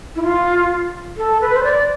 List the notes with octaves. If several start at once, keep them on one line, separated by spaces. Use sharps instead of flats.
E4
F4
A4
B4
C5
D5